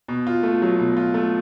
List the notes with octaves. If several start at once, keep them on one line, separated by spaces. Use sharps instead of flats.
B2
F4
A3
F#3
B2
F4
A3